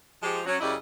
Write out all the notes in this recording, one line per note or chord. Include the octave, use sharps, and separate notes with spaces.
F3 G#3 G4
F#3 C#4
F#2 C#3 E4 G4 D5 D#5